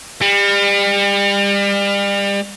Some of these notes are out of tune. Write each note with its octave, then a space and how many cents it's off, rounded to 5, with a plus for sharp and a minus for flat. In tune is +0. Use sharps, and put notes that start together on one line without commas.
G3 +35